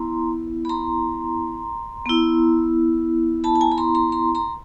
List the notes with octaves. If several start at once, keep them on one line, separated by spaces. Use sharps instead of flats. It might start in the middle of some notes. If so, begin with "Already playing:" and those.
Already playing: B3 E4 A#5 C6
B5
A#5 C6
B3 E4
A5 B5
A5
G#5 A#5
B5
A#5 C6
A#5 C6
A#5 C6
A#5 C6